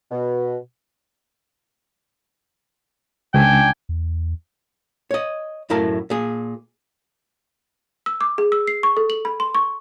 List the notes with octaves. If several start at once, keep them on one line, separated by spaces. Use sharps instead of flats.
B2
C#2 D4 G5 G#5
E2
C#5 D#5
F#2 A2 E4 A#4 F5 A5
A#2 G#4
E6
D6
G#4
E6
C7
C#6
A4
F#7
B5
C6
C#6